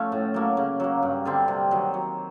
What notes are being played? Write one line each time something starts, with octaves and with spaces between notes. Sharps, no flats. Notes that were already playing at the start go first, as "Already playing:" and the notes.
Already playing: F3 A3 B3 C#4
A2
F#3 A#3
C#3
F#3 A#3
G2
D3 G3 C4
C3
D#3 F#3
F#3